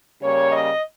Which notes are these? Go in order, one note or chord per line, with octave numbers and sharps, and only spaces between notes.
C#3 G3 A#3 C#5
D#5